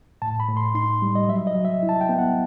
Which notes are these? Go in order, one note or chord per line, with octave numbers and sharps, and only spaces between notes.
A2 A5
B5
A2
C6
D#4 C6
G3
D#5
F#3 E5
D#5
F#3
E5
E4
A5
G5
B3
F#5